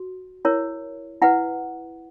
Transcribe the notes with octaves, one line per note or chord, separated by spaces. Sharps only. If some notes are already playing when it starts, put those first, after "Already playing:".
Already playing: F#4
E4 A#4 C#5
E4 B4 F#5